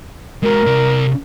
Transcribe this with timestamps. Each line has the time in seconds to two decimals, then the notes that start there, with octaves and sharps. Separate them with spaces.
0.43 G#3 F#4 A#4
0.66 C3 D5